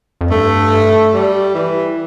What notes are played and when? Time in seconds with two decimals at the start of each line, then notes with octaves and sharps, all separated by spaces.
0.21 F2
0.31 G2 A3
1.14 G3
1.54 E3